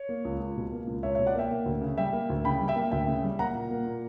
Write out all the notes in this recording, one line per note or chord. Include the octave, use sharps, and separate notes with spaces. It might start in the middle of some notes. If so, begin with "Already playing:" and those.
Already playing: C#5
A#3
C#2
C#2
B2
A#3
C#2
C#2 C#5 E5
C#5 E5
B2
D5 F#5
A#3 E5 G5
A#3
D2
C#3
G3 E5 G5
A#3
D2
C#3 G5 B5
G3
E5 G5
A#3
D2 E5 G5
C#3
G3
A#3 F#5 A#5
A#2
A#3
A#2